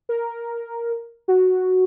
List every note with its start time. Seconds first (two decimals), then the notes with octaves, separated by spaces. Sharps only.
0.09 A#4
1.28 F#4